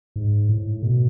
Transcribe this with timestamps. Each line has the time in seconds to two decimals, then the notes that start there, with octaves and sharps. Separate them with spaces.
0.16 G#2
0.49 A2
0.82 B2